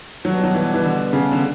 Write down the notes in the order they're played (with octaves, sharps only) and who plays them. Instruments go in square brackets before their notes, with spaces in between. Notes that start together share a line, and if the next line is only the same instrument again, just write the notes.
[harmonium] B2 G3 B3 D4 [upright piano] F#3
[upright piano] F#3
E3
E3
D3
C#3
D3